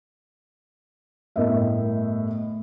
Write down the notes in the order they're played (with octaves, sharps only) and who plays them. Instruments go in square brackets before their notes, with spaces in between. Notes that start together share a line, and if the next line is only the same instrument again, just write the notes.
[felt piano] G1 A2 A#4 D#5 E5